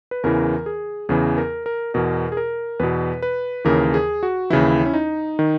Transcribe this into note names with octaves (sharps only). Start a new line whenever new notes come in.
B4
E2 C#3 E3 A#4
G#4
E2 C#3 E3 G#4
A#4
A#4
E2 B2 A#4
G#4
A#4
E2 B2 B4
B4
D#2 C#3 E3 A#4
G#4
F#4
D#2 C#3 E3 E4
C#4
D#4
D#3